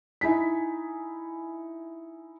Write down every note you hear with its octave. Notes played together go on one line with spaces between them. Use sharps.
D#4 E4 G#5 B6